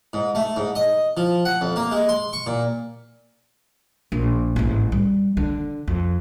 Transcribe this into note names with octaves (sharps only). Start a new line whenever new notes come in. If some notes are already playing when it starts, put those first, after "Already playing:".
G#2
A3
G#2
D#5
F3
F#5
F2
A#3
G#3
C6
C#6
A#2
A#1
A1 G#2
G3
D3
F2